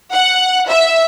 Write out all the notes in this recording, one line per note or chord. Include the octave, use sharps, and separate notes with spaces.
F#5
E5